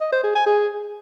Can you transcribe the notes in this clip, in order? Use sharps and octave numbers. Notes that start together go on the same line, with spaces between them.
D#5
C5
G#4
G#5
G#4